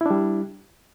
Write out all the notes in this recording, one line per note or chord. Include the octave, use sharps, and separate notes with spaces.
G3 D4 E4